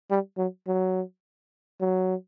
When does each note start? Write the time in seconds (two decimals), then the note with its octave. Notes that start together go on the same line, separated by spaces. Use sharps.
0.10 G3
0.38 F#3
0.67 F#3
1.81 F#3